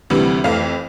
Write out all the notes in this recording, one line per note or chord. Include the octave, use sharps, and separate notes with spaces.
D2 C3 E3 G3
F2 E3 A3 F5